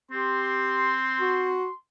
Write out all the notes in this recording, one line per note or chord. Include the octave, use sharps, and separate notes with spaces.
C4 G4 C6
F#4